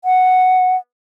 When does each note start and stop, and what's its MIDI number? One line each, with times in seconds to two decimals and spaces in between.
0.05 0.76 78